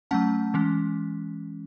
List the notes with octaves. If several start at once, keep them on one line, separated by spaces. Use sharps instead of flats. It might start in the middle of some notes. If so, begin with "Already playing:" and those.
F#3 A3 C#4 F#5 A5
E3 G#3 C#4